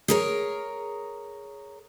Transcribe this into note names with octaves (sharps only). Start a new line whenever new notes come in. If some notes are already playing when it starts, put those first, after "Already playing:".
G#4 A#4 C#5